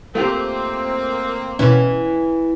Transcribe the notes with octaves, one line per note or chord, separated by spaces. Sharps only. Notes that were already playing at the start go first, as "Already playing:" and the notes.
A3 A#3 C4 F4 G4
B2 E3 C#4